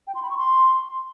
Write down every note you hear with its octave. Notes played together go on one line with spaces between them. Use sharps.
G5
C6
B5
C#6
C6